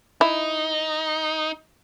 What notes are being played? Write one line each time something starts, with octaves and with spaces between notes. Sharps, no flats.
D#4 E4